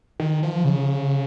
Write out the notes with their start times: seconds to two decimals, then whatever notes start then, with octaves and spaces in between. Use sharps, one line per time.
0.20 D#3
0.43 F3
0.64 C#3